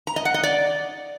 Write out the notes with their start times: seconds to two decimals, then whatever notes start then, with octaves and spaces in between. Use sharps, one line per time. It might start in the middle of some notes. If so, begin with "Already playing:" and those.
0.07 A#5
0.16 D#5
0.25 F#5
0.34 D#5
0.43 D5